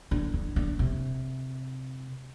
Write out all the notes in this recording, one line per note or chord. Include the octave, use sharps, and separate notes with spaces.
D3
D3
D3
C3